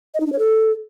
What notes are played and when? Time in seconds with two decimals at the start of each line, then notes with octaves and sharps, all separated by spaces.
0.14 D#5
0.20 D#4
0.26 D4
0.33 C#5
0.39 A4